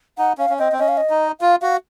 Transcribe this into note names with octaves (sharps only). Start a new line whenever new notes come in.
D#4 F#5
C#4 F5
C#4
C4 D#5
C4
C#4 D#5
F5
D#5
D#4
F4 F5
F#4 F5